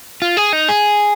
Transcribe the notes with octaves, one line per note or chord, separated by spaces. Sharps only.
F4
G#4
D#4
G#4